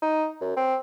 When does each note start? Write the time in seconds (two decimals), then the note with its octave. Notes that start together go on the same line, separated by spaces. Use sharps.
0.02 D#4
0.41 F#2
0.57 C4